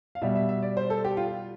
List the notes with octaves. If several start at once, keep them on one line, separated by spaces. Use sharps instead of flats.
F5
B2 G3 E5
E5
E5
D5
C5
A4
G4
F4